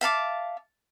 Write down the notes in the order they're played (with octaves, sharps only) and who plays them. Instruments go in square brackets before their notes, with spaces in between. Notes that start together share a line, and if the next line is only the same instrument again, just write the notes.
[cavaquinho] E5 F5 A5 D6